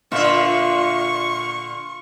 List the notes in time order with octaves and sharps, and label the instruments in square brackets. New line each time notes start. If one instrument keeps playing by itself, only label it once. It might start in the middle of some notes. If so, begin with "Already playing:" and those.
[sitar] A#2 D3 E5 [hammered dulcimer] F4 [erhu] C#6